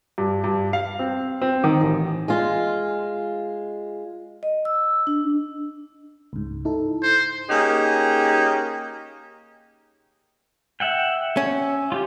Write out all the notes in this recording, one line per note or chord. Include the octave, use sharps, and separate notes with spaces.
G2
G2
F5
C4
C4
D#3
A1
G#3 F4
D#5
E6
D4
C#2 G#2
D#4 E4 A4
C5
A#3 C#4 D#4 G4 G#4
E5 F#5 G5
C#4
F4 G4